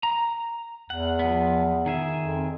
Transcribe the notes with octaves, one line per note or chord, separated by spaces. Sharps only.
A#5
E2 F#5
F3 B3
D#3 G#4 E5
F2